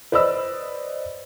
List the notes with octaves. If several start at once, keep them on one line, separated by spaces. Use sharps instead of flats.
B4 C5 D5 D#5 B5 E6